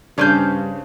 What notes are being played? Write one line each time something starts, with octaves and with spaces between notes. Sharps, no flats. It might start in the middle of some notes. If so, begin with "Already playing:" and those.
G2 C#3 C#4 D4 C5 F5 D6 G6